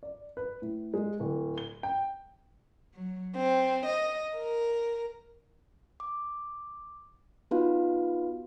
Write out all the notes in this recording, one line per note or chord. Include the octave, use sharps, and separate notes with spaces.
D5
B4
A2
G#3
D1
G7
G5
F#3
C4
D#5
A#4
D6
B3 D#4 F4 F#4 B4 F5